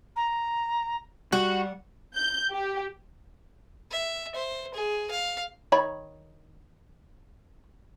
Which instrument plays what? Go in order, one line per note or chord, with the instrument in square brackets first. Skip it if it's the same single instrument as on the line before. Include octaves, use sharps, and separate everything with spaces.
[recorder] A#5
[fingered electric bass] G3 [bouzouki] F#4 [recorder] F#5
[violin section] G6
G4
[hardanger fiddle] E5
C5
G#4
F5
[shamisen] D#3 C#5 B5